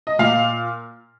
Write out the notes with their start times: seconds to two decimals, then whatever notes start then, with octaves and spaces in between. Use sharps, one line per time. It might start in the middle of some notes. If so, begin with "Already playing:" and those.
0.07 D#5
0.19 A#2 F5